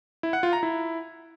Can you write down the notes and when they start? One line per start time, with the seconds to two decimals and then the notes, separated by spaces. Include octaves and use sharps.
0.23 E4
0.33 F#5
0.43 F4
0.53 A#5
0.63 E4